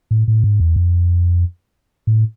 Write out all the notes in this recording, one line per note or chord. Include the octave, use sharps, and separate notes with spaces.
A2
A2
G#2
E2
F2
A2